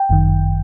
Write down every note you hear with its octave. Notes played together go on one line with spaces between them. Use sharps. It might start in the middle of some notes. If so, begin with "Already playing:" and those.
Already playing: G5
G1 F#2 D#3